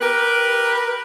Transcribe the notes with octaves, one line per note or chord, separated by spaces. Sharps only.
G4 A#4 B4